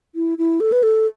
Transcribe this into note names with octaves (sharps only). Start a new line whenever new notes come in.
E4
E4
A4
B4
A4